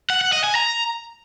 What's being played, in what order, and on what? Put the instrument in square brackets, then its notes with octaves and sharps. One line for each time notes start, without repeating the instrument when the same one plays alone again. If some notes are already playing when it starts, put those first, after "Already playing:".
[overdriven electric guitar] F#5
F#5
D#5
G#5
A#5